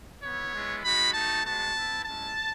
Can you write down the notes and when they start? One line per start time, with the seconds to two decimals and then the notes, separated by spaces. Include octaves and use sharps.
0.23 B3 E4 C#5
0.52 G#3 B3 E4
0.83 G#3 D#4 F#4 B5
1.13 A3 D#4 F#4 A5
1.44 G#3 B3 F#4 A5
1.75 B3 E4
2.04 G#3 C#4 E4 A5